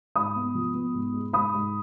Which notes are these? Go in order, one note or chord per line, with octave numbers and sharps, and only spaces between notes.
G#2 B5 D#6
B3
F3
B3
G#2
G#3
G#2 B5 D#6
G#2